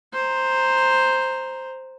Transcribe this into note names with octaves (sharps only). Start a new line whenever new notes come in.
C5 A#5